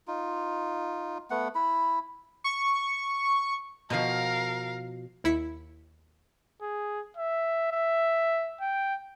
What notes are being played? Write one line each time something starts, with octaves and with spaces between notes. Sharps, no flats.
D#4 F4
A3 B3 F#5
E4 B5
C#6
B2 F3 A#4 F5
D#2 E4 B6 C#7
G#4
E5
E5
G5